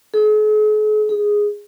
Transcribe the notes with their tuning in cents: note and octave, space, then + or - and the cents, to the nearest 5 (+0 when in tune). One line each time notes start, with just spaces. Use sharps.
G#4 +45
G#4 -5